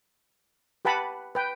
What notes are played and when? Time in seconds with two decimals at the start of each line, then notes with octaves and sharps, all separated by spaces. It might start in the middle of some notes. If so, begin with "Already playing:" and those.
0.85 G4 B4 F#5 A5 B5
1.35 B4 G5